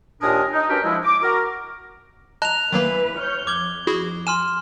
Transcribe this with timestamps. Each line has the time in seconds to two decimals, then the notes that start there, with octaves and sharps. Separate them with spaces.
0.21 D#2 A#2 D4 A#4 G#5 D#6
0.53 D#4
0.69 C#4 D4 F#4 G4 A#4 B4
0.84 F3 G#3 E4
1.04 D6
1.22 F#4 A#4
2.42 D#5 A5 A#5 F#6 F7
2.72 D#3 E3 F#3 A#3 B4
3.17 C#5 F6 G6
3.47 F2 D6 G#6 G7
3.87 E4 F#4 G#4
4.27 G#5 C6 F6 E7